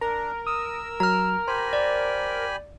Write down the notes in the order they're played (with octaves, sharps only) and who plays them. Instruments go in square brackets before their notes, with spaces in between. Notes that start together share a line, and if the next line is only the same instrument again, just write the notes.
[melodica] D4 [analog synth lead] A#4 [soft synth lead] A#5
[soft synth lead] D#6 [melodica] E6
[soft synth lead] F#3 [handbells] A#5 F6
[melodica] G4 G#5 B5 [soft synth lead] C5
[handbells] D5